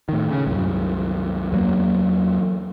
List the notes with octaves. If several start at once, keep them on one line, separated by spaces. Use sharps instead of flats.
A2 D#3
C#3
C2 F#2
E2 F#3 A#3